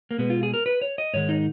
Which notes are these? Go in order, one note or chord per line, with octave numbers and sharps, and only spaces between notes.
A#3
B2 G#3 B3
F4
G#4
A#4
B4
C#5
D#5
G#2 D#3 G#3 C#5
D#4